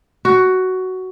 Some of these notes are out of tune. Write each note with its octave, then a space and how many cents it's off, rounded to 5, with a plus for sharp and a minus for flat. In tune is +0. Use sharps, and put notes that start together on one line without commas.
F#4 +10